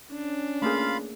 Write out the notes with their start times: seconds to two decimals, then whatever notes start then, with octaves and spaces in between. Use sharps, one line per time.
0.12 C#4 D4
0.62 A3 A#3 F4 G#4 F5 B5